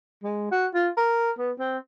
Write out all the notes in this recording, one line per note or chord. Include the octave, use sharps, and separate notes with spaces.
G#3
F#4
F4
A#4
B3
C4